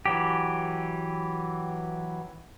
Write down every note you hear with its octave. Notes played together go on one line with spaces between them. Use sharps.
E3 F#3 G4